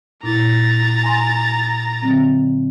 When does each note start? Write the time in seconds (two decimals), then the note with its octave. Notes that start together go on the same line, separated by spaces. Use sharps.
0.23 A#2 E4 A#5 A6
1.03 G#5 C6
2.02 D3 F#3 C4